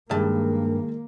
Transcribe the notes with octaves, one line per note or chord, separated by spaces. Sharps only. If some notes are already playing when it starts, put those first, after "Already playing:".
G2 D#3 G#3 A#3 G#4 A5